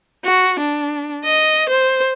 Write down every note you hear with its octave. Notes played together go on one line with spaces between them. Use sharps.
F#4
D4
D#5
C5